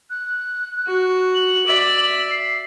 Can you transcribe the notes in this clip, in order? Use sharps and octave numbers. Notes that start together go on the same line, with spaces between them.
F#6
F#4
F#7
D5 E5
C7